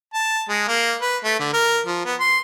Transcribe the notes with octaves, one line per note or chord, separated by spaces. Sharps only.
A5
G#3
A#3
B4
A3
D3
A#4
F3
B3
C6